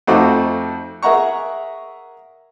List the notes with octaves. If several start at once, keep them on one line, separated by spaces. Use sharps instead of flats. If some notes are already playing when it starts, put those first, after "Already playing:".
F2 A3 D#4 F#4 C5 D6
G#4 A#4 E5 F#5 A#5 C#6